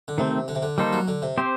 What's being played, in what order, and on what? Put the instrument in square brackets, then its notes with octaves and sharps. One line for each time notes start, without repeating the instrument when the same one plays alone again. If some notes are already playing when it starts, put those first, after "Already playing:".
[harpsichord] D3
[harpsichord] C3 [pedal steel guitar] D#3 A3 C4
[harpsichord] D3
C3
D3
[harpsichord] D#3 [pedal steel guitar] G3 A#3 D#4 A4 C5
[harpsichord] F#3
D3
C3
[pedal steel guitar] C4 G4 C5